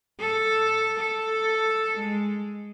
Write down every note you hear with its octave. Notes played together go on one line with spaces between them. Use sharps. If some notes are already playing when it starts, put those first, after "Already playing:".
A4
A4
G#3